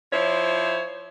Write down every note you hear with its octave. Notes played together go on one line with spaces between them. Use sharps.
F3 E4 C5 C#5